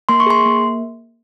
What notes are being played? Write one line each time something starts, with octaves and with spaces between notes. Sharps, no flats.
A#3 C6
C#6
G#4 C6
A#3